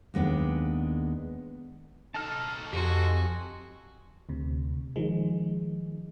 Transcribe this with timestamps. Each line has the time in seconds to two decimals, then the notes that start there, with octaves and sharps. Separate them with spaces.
0.14 D#2 G#3 B3 D4 G5
2.14 D#4 A4 A5 F6
2.73 F2 F#4 G4 G#5 C6
4.29 D2 C3
4.96 D#3 F3 G#3